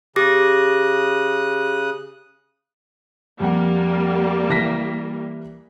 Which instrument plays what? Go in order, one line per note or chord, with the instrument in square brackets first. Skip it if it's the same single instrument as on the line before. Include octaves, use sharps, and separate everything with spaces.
[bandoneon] C#3 D#6 F#6 [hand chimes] G4 D6 A#6
[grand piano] F2 F#5 [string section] G3 A#3
[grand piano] E3 A#6 B6